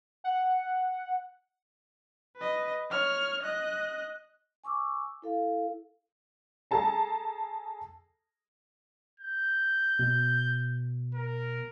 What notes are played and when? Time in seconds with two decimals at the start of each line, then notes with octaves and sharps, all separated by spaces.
0.24 F#5
2.37 B4 D#5
2.91 C#5 F6
3.43 D#5 F#6
4.64 G#5 C#6 D6 E6
5.22 E4 A4 F5
6.71 G#4 A4 A5 A#5
9.20 G6
9.99 B2
11.15 A#4